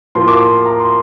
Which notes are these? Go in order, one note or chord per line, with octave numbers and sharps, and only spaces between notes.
A2 F3 A#3 C6
D6
C6
A#5
C6